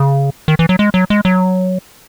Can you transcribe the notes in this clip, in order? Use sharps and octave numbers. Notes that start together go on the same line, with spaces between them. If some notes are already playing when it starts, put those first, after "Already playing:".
Already playing: C#3
D#3
E3
F#3
G#3
F#3
G#3
F#3